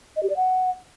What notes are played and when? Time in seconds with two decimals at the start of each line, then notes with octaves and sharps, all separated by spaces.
0.16 D#5
0.23 G4
0.30 D5
0.36 F#5